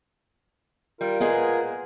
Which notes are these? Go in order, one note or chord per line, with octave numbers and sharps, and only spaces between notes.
G3 F4 A#4
A#2 G#3 A#3 B3 G#4